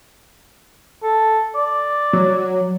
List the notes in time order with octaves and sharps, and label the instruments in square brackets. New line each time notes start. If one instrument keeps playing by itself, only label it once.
[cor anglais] A4
D5
[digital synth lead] F#3